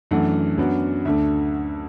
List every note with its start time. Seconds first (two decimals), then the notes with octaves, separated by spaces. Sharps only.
0.11 F#2 E3 A3 D4 F#5
0.58 F#2 F#3 B3 D4
1.05 D2 D3 A3 D4 E5